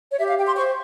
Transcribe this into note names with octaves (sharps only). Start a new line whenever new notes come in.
C#5
G4 E5
F5
G4 G5
C6
C5 C#6